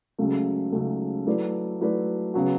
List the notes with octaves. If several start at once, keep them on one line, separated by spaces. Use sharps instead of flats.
C#2 C#3 F#3 A3
C#2 C#3 F#3 A3
F#3 A3 E4 B4 D5
F#3 A3 E4 B4 D5
C#3 F#3 B3 F#4